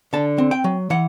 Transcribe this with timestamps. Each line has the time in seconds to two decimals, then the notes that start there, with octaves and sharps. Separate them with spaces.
0.13 D3 A5
0.38 C4
0.51 G5
0.64 F#3
0.90 E3 F#5